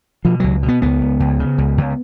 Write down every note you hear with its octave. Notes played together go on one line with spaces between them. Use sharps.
B2 F3
C#2 F#3
B2
B3
C#2 B3
C#2
C#2
C#3
C#2
C#2